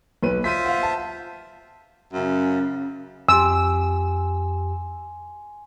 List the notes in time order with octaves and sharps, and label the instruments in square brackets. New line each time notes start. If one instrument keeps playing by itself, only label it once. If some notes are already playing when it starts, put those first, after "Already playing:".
[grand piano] B1 B4 D#7
[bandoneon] F4 C5 E5 [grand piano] B6 D#7
[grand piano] F5 F#5
A5
[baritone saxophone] F#2 [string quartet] C#3
[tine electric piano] F2 G4 [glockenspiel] G#5 C6 [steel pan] E6